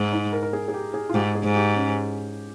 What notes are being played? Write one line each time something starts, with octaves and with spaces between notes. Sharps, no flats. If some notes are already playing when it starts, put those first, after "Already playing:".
Already playing: G#2
D#4
A#4
A#4
G#4
G#4
G4
G#4
F4
G#2 G4
G#4
G#2
G4
C#4